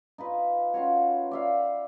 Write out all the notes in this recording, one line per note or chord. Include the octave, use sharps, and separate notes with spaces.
D#4 F4 B4
C#4 F4 F#4 C#5
D5 E5 F5